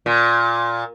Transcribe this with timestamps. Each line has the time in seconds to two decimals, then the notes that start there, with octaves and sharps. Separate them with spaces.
0.06 A#2